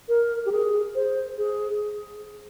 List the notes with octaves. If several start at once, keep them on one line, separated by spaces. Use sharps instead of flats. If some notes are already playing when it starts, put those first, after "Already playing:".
A#4
G4
G#4
C5
G#4